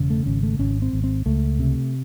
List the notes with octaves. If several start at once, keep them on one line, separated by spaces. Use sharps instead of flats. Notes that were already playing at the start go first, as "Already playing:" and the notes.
Already playing: E1 C#3
A3
G#1 C#4
A3
G#1 C#4
C4
G#1
C4
C#2 A3
C3